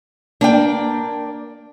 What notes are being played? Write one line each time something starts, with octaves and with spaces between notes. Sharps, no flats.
A#3 D4 D5 G5